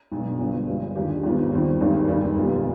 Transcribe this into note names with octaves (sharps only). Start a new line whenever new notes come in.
B1 B2 G#3 D4
G1 G2 F3
G2 F3 G#3
D#2 D#3 G#3 D4 G4
G#1 G#2 F3 B3
D#2 D#3 G3 C4
G#1 G2 D#3 G#3
F1 D#2 D#3 G3
B1 B2 G#3 B3 F4